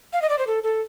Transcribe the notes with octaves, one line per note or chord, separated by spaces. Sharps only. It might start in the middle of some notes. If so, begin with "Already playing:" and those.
F5
D#5
D5
C5
A4
A4